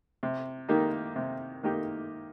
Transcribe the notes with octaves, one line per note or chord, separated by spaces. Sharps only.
C3
D#3 A#3 D#4 G4
C3
D#3 A#3 D#4 G4